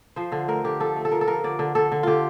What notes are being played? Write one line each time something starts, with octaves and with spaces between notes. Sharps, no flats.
F3 C5
D3
A3 A#4
D3 G4
F3 A4
A3
A4
F3 A#4
A4
F3 A#4
D3 D5
D3
D3 A4
D3
D3 F4 G4